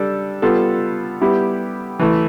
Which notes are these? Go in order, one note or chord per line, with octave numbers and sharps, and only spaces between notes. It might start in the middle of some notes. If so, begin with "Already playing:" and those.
Already playing: G3 D4 A4
G3 B3 F4 A4
G3 B3 E4 G4
E3 A3 E4